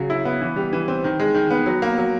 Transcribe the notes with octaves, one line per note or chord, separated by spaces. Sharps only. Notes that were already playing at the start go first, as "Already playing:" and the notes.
Already playing: C#3 F#3
E4
B3
E3
G3
E3
C4
D#3
G#3
D#3
B3
F#3
A#3
F#3